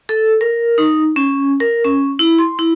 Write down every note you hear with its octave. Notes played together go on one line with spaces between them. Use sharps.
A4
A#4
D#4
C#4
A#4
C#4
E4
C6
E4